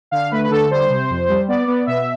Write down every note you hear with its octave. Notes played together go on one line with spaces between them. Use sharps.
D3 F5
A3 B4
B4
D3 A4
G3 C5
C3
F2
G3
B3 D5
B3
B2 E5